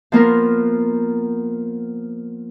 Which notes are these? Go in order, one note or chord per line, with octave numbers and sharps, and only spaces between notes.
F3 A#3 B3 A#4